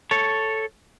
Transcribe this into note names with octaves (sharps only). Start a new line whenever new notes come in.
A4 C#5